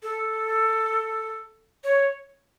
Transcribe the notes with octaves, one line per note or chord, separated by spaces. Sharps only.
A4
C#5